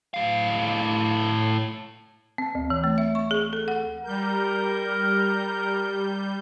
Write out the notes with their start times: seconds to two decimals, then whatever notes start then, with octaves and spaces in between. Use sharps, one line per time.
0.14 A2 F5
2.38 C4
2.55 D2
2.70 E3
2.84 A3
2.98 E5
3.15 C#6
3.31 G#4
3.53 A4
3.68 F#5
4.05 G3 A#4 G6